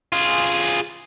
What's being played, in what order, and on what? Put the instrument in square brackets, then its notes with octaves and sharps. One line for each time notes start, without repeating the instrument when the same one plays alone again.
[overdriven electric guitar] F4 G#4